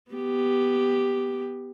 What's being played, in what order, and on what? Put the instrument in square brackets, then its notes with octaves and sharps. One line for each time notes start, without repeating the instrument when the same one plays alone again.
[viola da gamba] B3 G4